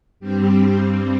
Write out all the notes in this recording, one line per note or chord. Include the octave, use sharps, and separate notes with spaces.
G2 G3 C4 G4